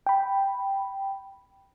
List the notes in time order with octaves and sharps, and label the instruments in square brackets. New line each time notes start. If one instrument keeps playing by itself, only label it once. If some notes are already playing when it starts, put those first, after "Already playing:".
[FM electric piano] G5 B5